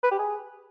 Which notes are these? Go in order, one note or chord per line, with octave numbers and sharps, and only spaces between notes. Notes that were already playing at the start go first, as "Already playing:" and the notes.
B4
G4
G#4